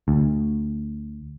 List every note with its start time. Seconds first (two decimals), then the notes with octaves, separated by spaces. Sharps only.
0.08 D2